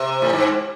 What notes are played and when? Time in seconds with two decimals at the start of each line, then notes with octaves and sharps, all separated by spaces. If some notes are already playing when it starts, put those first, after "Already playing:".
Already playing: C3
0.22 A2
0.33 G#2